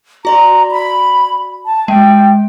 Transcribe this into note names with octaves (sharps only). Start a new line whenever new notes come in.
F#4 D5 A#5 C6
B5
A5
G#3 G5